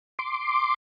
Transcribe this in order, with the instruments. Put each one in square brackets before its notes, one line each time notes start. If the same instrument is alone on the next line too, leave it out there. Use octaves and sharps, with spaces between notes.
[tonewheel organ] C6 D6